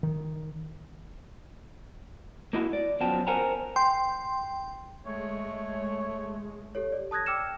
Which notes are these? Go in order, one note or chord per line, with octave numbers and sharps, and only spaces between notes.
D#3
A#3 D#4 E4 F#4
D5
F#2 F3 F#3 B3 G5 A5
A#4 C5 F#5 G#5 A#5
G5 C6
G#3 A3 C#5
G4 A4 C#5
D5
A5 D#6 F#6 G#6 A#6
G5 D6 E6 F6 C#7 E7